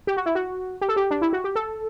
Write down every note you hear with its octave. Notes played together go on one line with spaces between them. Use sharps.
G4
F#4
E4
F#4
G4
A4
G4
D4
E4
F#4
G4
A4